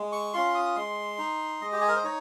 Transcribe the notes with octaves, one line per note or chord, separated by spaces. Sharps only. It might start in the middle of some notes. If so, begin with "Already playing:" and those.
Already playing: G#3
C#6
C#4 F4 C6
D#6
G#3 C6
D#4
G#3 D#5
G4
G#4
A#4
C5
D#4 C#5